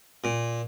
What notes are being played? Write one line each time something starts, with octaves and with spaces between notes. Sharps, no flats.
A#2